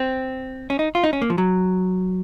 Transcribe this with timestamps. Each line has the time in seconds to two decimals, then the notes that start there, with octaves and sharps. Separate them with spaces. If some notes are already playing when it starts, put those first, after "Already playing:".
Already playing: C4
0.70 C#4
0.79 D#4
0.95 F4
1.04 D#4
1.13 C#4
1.22 A#3
1.30 F3
1.38 F#3